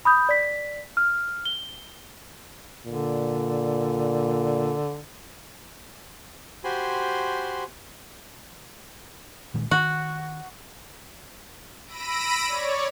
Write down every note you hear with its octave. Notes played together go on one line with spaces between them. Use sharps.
B5 D#6 G6
D5 B6
F6
G7
A#2 D3
F#4 G4 C5 G#5 B5 C6
A#2 D#3 G#3
D#3 F#4
B5 E6 A#6 D7 D#7
C#5 D5